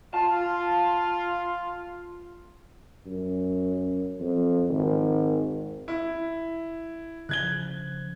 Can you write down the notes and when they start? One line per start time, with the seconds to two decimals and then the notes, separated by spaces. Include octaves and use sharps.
0.14 F4 A5
3.06 F#2
4.20 F2
4.69 G#1
5.88 E4
7.29 C#3 F3 F#6 G#6 G7